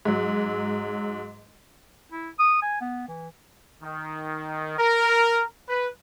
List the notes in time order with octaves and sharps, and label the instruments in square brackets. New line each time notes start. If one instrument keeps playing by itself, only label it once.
[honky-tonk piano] G#2 F#3
[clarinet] E4
D#6
G#5
B3
E3
[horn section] D#3
A#4
B4